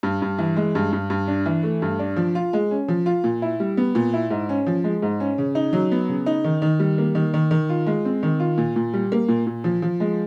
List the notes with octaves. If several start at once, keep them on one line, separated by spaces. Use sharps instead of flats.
G2
G2
E3
G#3
G2
G2
G2
D4
E3
A3
G2
D4
F3
F4
G#3
C#4
F3
F4
A#2
E4
G3
B3
A#2
E4
G#2
C#4
F3
G#3
G#2
C#4
C#3
D#4
F#3
B3
C#3
D#4
D#3
D#3
G3
A#3
D#3
D#3
D#3
F4
G#3
C4
D#3
F4
A#2
A#2
G3
A#3
A#2
A#2
F3
F3
G#3